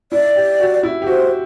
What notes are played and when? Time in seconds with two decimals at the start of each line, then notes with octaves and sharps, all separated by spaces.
0.12 E4 D5
0.36 G4
0.60 F#4
0.83 E4
1.02 G4
1.07 F#4 C5